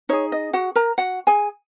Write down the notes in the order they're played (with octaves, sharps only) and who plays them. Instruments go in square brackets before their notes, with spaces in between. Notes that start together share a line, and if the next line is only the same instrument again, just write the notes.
[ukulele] D#4 G#4 C#5
D#5
F#4 F#5
A#4 A#5
F#4 F#5
G#4 G#5